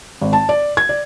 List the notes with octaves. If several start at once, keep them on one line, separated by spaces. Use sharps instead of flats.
G#1
A5
D5
G#6
D5